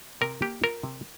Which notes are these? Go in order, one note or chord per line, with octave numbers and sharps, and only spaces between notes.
C3 A#4
A#3 G4
F4 A#4
C3